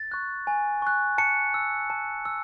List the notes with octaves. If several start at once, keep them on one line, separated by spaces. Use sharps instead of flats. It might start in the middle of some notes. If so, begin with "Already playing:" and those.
Already playing: A6
C#6 F#6
G#5
C#6 F#6
A5 C#7
E6
A5
E6